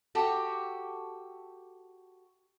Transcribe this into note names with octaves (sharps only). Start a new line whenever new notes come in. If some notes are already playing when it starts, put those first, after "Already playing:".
F#4 G4 A4